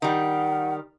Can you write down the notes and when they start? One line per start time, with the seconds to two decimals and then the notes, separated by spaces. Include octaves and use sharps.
0.02 D#3 G3 F#5